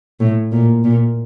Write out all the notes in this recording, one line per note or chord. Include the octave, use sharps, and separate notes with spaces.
A2
A#2
A#2